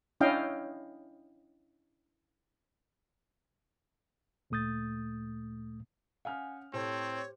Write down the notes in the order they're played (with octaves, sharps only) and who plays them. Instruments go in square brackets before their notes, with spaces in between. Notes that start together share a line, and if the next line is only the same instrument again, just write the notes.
[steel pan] C#4 D4 E4 D#5 F5 G5
[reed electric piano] D2 A#2 A3 D#6 G6 A6
[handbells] C#4 F#5 [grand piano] F5 G#5 F6
[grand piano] A2 A4 [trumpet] C4 [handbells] G4 C5 [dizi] C#5